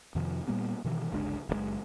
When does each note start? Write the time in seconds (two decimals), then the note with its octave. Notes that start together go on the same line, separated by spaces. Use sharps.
0.15 F2 C3 D#3 F3
0.48 A#2 G3 A#3 B3
0.84 B2 D#3 E3
1.12 G1 C#2 G#3 D4
1.49 F#1 C3 G#3